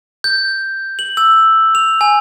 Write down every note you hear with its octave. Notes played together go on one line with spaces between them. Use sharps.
G6
F#7
E6
F7
G#5